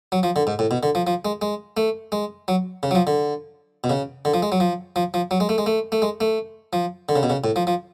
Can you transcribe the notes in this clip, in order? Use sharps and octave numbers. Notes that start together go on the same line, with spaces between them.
F#3
F3
D3
G#2
A2
B2
D3
F3
F3
G#3
G#3
A3
G#3
F#3
C#3
F#3
F3
D3
B2
C#3
D3
F3
G#3
F#3
F3
F3
F3
F#3
G#3
A3
G#3
A3
A3
G#3
A3
F3
D3
C#3
B2
C#3
A2
F3
F3